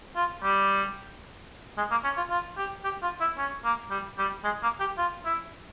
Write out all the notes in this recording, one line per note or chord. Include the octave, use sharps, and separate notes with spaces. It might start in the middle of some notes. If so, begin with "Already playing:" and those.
F4
G3
G#3
A#3
C#4
F4
F4
G4
G4
F4
E4
C#4
A#3
G3
G3
G#3
A#3
G4
F4
E4